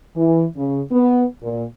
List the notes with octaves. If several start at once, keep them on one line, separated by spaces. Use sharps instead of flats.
E3
C#3
B3
A#2